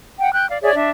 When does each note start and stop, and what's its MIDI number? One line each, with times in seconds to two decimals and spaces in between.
0.19 0.31 78
0.19 0.31 79
0.33 0.49 79
0.33 0.49 90
0.49 0.57 74
0.49 0.57 77
0.62 0.73 68
0.62 0.73 73
0.62 0.73 74
0.62 0.73 76
0.75 0.90 62
0.75 0.90 76